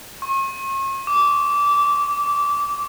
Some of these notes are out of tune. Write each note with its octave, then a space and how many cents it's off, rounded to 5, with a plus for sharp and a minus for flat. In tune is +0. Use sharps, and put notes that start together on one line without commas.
C#6 -45
D6 -20
D6 -5